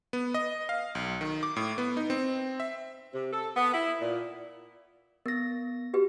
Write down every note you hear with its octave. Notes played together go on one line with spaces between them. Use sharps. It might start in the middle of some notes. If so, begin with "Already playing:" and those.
B3
D#5
F5
B1
D#3
D6
A2
B3
D#4
C4
E5
C3
A4
B3
E4
A#2
B3 A#4 A#6
F#4 G4 B4